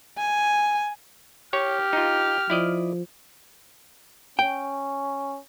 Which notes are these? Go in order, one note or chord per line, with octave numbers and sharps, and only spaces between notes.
G#5
G4 C#5 F6
D#4 F4
F3 E4 D5 D#5
C#4 G5